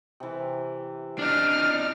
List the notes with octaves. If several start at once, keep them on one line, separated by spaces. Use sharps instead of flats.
C3 E3
D4 D#4 F6